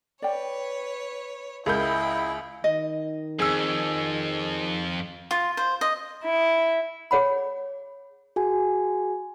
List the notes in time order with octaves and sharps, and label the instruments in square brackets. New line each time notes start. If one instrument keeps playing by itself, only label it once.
[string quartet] B4 C#5 [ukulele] D5 G5
[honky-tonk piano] C#2 G6 [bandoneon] E4 [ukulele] G#4 A#4 E5 [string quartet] D#5 G5
[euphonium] D#3 [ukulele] D#5
[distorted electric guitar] F2 [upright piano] G#4 E6
[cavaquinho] F4
C5
D#5
[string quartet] E4
[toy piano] G#4 C#5 F#5 B5
[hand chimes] F#4 G#4 G#5